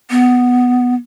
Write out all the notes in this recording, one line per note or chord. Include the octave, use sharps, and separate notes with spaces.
B3